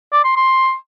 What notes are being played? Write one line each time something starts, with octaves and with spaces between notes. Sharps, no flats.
D5
C6
C6